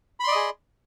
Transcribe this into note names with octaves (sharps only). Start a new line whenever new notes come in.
G#4 D5 D#5 B5 C6